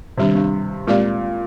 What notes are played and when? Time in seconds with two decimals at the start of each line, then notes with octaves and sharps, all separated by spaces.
0.17 C3 D#3 G3 D4
0.35 G2
0.87 A#2 G#3 C4 G4 D5